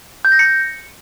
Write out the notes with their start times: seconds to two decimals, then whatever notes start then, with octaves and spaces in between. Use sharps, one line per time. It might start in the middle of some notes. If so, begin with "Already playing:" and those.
0.25 G6
0.32 A#6
0.39 C#7